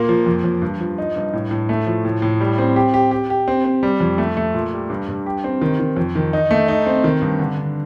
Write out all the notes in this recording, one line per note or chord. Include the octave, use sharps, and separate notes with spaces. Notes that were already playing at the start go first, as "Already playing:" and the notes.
Already playing: A#2 A#3
F3
F2
F2
G2
F3
D#4
G2
A2
A2
A3
F3
A2
A2
G3
C4
G4
G4
G4
G4
C4
C4
G3
F2
A3
A3
A#2
G3
G2
G2
G4
C4
D#3
D#3
F2
D#3
D#4
A3
D#4
C4
D#3
G2
D3
D3